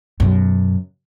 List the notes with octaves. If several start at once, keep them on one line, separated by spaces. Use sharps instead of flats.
F#2 B2